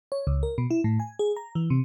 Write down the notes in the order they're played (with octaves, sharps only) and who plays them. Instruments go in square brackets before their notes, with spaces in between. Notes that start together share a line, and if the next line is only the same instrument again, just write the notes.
[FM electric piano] C#5
C#2
A#4
B2
E4
A2
G#5
G#4
A#5
E3
C3